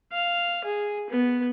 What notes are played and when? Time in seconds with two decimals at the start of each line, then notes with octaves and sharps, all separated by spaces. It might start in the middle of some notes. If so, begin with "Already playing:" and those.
0.13 F5
0.65 G#4
1.10 B3